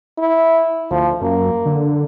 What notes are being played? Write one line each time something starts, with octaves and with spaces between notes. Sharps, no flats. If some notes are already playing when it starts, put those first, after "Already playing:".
E4
D2 F3
F#2 A#3
D3